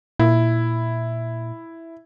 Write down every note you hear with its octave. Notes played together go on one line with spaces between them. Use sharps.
A#2 E4